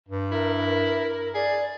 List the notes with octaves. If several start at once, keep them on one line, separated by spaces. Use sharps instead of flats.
G2
E4 A#4
A#4
G#4 D5